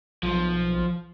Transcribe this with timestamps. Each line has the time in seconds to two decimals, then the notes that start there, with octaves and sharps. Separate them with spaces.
0.23 B1 F3